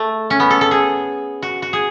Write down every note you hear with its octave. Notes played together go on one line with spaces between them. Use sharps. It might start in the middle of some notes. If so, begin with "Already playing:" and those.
Already playing: A3
C#4
B3
A4
A4
G#4
F#4
F#4
G#4